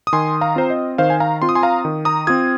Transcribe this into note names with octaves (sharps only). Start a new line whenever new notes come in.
D#6
D#3 G#5 C6
F5 A#5
C4 F4 C5
D#5
D#3 C5 F5
G#5
F5 A#5
C4 F4 C6
D#6
G#5 C6
F5 A#5
D#3
A#5 D#6
C4 F4 D#6 G#6